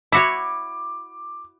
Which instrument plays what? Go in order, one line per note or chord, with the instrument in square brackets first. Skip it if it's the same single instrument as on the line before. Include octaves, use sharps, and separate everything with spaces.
[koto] E4 F#4 C#5 [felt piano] D6